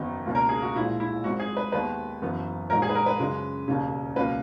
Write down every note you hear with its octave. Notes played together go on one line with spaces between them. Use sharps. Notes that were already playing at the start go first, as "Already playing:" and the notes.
Already playing: F#1 E2 D#3 F#3 B3 D#4
C#2 B2 A#3
A#4
G#4
F#4
A#1 A#2 G#3 E4
E4
G#1 G#2 F#3 F#4
G#4
B4
D#2 D#3 G#3 B3 B4
F#1 F#2 E3 B3
A#1 G#2 D#3 A#4
G#4
B4
A#4
B4
F#2 C#3 G#3
E1 D#2 C#3
C#2 B2 F#3 A#3 B4